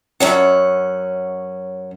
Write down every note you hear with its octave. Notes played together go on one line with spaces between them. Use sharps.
F#2 C#4 F#5